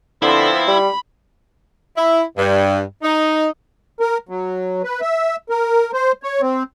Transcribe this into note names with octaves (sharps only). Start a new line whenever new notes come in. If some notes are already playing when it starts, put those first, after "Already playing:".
D3 F3 B3 C4 E4 C6
G3 B5
E4
G2
D#4
A#4
F#3
B4
E5
A#4
C5
C#5
C4